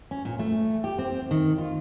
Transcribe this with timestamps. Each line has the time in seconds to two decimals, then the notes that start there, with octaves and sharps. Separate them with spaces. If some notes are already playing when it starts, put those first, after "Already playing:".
0.11 C#4
0.25 A#2
0.39 A3
0.84 G4
0.98 C4
1.31 D#3
1.58 F4